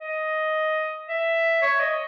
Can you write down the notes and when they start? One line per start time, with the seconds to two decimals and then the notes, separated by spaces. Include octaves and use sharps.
0.01 D#5
1.09 E5
1.62 C#5
1.80 D#5